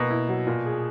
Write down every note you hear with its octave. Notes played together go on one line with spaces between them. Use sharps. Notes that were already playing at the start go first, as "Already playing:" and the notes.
Already playing: B2 A#3
E4
F#3
A#2
G#4